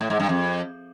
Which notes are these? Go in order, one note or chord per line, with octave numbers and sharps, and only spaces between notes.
A2
G#2
G2
F2